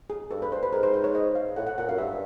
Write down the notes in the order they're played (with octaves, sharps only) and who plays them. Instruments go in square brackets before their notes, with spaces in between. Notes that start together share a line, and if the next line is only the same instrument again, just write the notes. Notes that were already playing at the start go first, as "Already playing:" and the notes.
[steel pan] G#4
[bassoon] G2 [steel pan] A4
[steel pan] B4
C5
B4
[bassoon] G#2 [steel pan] A#4
[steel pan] C5
C5
C#5
D#5
F5
[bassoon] A2 [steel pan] F#5
[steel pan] F#5
[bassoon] A#2 [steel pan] F#5
[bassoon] F#2 [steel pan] F5
[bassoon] G2 [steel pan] E5